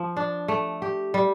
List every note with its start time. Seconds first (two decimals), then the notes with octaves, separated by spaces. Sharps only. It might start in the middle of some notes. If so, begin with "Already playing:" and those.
Already playing: F3
0.17 D4
0.48 A3
0.82 G4
1.14 G3